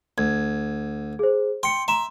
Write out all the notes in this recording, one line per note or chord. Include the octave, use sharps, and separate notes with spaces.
D2 G#6
G#4 C5
G5 C6 C#7
E5 A#5 C6 E7